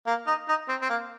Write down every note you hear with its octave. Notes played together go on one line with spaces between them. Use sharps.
A#3
D#4
D#4
C4
C4
A#3